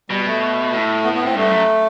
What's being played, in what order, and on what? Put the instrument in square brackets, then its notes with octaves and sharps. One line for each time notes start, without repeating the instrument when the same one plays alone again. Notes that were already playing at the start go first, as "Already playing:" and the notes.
[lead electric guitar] B2 [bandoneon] G3
[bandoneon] A3
[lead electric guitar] A2
[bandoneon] B3
B3
C4
[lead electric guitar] G2 [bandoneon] A3
[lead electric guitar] F#2